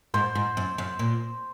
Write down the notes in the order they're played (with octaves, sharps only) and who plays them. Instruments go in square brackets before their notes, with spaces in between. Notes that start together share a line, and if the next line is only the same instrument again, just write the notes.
[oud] G#2 [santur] C5
[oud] G#2
F#2
F#2
A#2